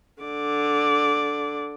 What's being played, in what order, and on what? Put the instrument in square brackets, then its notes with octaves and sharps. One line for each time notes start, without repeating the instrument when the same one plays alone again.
[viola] D3 D5